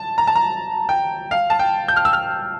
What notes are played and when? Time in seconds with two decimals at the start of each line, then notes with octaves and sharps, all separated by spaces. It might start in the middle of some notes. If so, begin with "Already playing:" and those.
Already playing: A5
0.18 A#5
0.27 A5
0.35 A#5
0.89 G5
1.31 F5
1.50 A5
1.59 G5
1.88 G6
1.96 F6
2.05 E6
2.13 F6